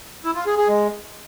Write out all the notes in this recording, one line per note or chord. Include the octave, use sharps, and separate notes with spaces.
E4
F4
G#4
G#4
G#3